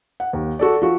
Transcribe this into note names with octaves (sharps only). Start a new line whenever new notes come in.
F#5
D#2
F#4 A4 D5
F3 F#4